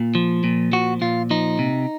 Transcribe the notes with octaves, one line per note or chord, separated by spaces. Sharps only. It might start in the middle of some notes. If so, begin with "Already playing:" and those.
Already playing: A#2
F3
A#2
F3 F#4
A#2 F4
F3 D#4
C3